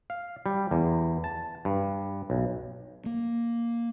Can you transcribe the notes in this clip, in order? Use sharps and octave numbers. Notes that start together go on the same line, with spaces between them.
F5
G3
E2
A5
G2
B1
A#3